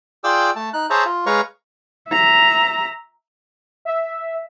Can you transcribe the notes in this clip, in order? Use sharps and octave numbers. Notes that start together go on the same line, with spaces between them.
F4 G#4 D5 G5 D6 E6
A3 A5
D#4 F#6
G#4 C5 C#5 E5 A5 A#5
F4
G#3 B4 C#5 F5 A#5 C#6
E5 A#5
E5